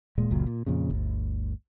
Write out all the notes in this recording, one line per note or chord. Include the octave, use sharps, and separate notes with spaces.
D#1 A#2 G#3
F#1 C#2 A#2 F#3
A#2
F2 A#2 C#3
G1 D2